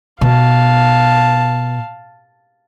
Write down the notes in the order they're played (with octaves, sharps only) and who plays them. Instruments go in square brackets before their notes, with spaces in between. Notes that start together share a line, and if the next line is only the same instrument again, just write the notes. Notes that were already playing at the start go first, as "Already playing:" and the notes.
[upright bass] B2 [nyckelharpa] F5 A5